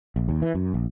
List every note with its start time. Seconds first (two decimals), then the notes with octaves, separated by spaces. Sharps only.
0.16 A#1
0.29 D#2
0.42 E3
0.55 F#2
0.74 A#1